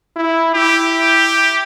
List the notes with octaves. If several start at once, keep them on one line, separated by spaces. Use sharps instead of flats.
E4
E4 G4